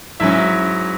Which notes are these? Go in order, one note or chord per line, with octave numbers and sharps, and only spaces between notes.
G#2 F#3 C#4 E4 E5